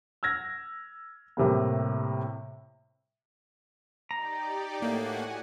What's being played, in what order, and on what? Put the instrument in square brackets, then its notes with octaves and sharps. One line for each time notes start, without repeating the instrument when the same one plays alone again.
[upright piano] E6 F6 G#6 A#6
A2 C3 G3 A#3
[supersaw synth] D#4 G4 D5 [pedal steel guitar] A#5
[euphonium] A2 [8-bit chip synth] A#3 [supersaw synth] F#4 F#5 G#5